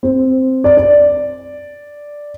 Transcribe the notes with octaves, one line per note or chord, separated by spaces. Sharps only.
C4
D5
D5